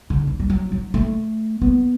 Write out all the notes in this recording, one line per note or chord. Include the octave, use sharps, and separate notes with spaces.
D3
E3
G3
F#3
F#3
A3
B3